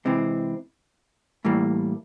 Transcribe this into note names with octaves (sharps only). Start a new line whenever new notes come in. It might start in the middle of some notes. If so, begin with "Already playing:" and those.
C3 E3 G#3 C4
A2 E3 G3 A#3